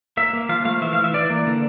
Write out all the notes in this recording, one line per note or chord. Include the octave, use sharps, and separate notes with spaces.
A#3 E5
A#3
F3 F5
A3 F5
E3 E5
F5
E3
E5
E3 D5
A#3
D3